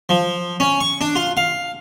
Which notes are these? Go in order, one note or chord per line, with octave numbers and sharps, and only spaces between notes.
F3
C#4
C#6
D4
F4
F5